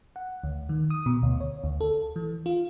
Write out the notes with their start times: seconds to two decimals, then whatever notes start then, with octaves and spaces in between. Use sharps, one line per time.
0.16 F#5
0.44 D2
0.69 D#3
0.90 D#6
1.06 B2
1.23 D2
1.40 C#5
1.64 D2
1.81 A4
2.16 E3
2.46 F4